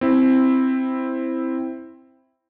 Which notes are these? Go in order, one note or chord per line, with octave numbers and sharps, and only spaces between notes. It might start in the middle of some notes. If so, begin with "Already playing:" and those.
C4 E4